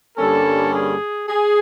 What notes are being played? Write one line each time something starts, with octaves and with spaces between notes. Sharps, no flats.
G2 D3 G3 A#3 C#4 A4
G#4
G#4